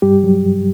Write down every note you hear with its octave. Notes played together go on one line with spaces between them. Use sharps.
G2 G3 G4
F#3
G2